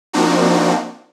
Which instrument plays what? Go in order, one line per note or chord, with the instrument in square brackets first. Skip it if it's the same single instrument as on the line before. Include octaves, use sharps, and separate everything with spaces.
[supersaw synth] F3 A#3 C4 D4 D#4 F#4